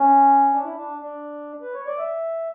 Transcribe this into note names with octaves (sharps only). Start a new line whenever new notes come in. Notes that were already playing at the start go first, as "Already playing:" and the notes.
Already playing: C#4
D4
E4
D4
D4
B4
C#5
D5
E5